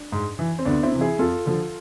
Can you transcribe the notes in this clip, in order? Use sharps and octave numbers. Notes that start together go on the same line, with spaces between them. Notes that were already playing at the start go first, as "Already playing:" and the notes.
Already playing: D4
G#2
E3
C4
D2 B3 D4
C4 E4
C3 E3
E4 G#4
F2 F4 A4
D3 F3